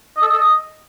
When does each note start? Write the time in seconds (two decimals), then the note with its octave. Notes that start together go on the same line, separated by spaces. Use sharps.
0.17 D#5
0.22 A4
0.27 D#5
0.33 A4
0.38 D#5